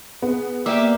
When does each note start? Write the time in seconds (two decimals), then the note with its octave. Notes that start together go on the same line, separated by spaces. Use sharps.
0.22 B3 G#4
0.66 A#3 G4 D5 E5 D6